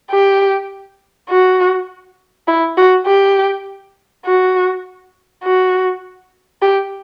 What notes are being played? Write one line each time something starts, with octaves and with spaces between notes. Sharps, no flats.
G4
F#4
E4
F#4
G4
F#4
F#4
G4